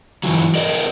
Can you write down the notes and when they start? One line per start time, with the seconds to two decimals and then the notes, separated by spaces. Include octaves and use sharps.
0.23 G2 E3 F#3
0.55 G#4 A#4 D5 D#5